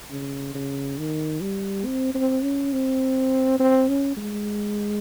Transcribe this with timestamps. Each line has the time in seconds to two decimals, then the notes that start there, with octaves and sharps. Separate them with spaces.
0.10 C#3
0.55 C#3
0.98 D#3
1.41 G3
1.85 C4
2.15 C4
2.43 C#4
2.73 C4
3.60 C4
3.89 C#4
4.17 G#3